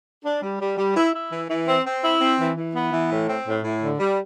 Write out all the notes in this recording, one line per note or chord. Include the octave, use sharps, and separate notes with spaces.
D4
G3
G3
G3
E4
E4
E3
E3
C4
C4
E4
C4
E3
E3
B3
E3
A2
C4
A2
A2
D3
G3